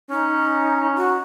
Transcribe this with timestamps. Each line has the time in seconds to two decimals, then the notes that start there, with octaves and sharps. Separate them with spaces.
0.10 C#4 D#4
0.96 F#4